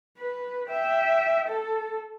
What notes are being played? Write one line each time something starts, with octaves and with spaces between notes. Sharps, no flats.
B4
E5 G5
A4